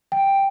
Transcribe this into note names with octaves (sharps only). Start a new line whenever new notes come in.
G5